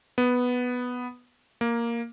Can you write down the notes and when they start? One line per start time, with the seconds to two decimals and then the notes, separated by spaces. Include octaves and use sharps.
0.18 B3
1.61 A#3